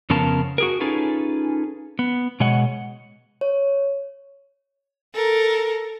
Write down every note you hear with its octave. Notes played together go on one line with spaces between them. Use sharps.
F2 C#3 B3 C#4 A#4 A5
F#4 G#4 A#4
C#4 D#4 F4 G#4 A4 B4
B3
B2 G#3 C#5 D#5 F#5
C#5
A4 A#4